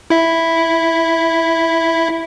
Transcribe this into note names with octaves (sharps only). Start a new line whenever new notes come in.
E4 E5